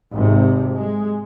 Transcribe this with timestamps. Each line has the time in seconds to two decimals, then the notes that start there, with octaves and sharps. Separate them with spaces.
0.11 G#1 G#2 C3
0.75 G#3